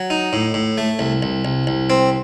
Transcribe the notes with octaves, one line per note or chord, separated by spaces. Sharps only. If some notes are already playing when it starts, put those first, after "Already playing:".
Already playing: F#3
D#4
A2
A2
A3
C2
C2
C2
C2
C4